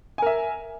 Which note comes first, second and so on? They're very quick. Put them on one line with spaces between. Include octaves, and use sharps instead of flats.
G#5 A#4 E5